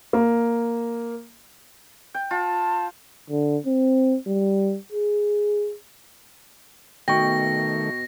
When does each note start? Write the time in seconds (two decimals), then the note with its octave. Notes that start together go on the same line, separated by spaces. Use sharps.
0.13 A#3
2.14 G5
2.31 F4 A5
3.30 D3
3.67 C4
4.27 G3
4.92 G#4
7.08 B2 D#3 A3 G5 C#6 A#6